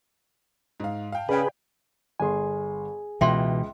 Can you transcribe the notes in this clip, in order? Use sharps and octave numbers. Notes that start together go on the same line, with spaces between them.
G#2 F5
F5 G5 A5
C#3 G#4 B4 D5 F5 G5
G1 G#4 G#5 C6
C#2 B2 E3 E5 G5 C6